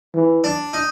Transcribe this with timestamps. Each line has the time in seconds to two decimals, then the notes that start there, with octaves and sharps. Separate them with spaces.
0.14 E3
0.44 D4
0.73 D#4